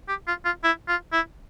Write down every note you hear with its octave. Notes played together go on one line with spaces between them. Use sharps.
G4
F4
F4
E4
F4
E4